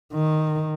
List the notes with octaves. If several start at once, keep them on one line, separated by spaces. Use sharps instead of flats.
D#3